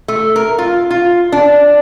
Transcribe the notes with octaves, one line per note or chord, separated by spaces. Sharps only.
A3
A#4
F4
F4
D4